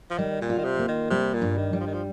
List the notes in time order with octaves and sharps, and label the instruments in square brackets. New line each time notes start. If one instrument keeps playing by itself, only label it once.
[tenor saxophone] F3
[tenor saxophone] D#3 [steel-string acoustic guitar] G3
[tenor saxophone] A#2
[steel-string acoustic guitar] F4
[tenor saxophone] D#3
C3
[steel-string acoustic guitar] A#3
[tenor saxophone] D#3
[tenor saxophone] C3 [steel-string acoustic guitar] G3
[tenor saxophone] A#2
[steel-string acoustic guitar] G2
[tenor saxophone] D#3
[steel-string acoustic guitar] G3
[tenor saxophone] F3
D#3
F3